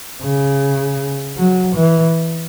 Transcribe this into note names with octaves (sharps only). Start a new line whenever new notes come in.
C#3
F#3
E3